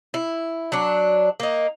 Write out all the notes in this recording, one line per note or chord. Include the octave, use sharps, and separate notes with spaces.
E4
F#3 D4
A#3 D#4